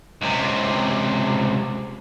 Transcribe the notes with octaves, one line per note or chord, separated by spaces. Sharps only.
C#2 C3